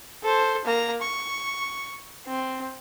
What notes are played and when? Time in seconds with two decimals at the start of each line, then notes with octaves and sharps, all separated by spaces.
0.24 A4 C5
0.65 A#3 A#5
1.02 C#6
2.27 C4